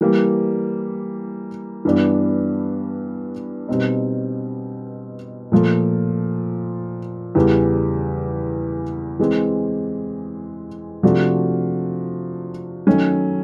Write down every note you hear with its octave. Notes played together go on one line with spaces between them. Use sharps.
E3 G3 A#3
G2 E3 G3 B3 D4
B2 G3 C4 D#4
A#2 F3 A3
E2 C#3 E3 G3
E3 G#3 C4
C3 F3 A3 D4 F#4
D#3 F#3 A3 C#4